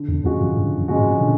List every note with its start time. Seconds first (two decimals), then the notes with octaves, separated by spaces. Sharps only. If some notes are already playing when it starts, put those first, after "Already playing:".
Already playing: D3
0.09 E2
0.24 F2 F3 G#3 C#4 F#4
0.40 F#2
0.56 G2 D3
0.78 F#2
0.88 F3 G#3 C#4 F#4
0.99 G#2
1.20 B2 D3